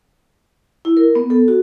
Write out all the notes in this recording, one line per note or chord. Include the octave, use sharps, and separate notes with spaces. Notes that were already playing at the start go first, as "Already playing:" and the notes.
E4
A#4
B3
A4
F#4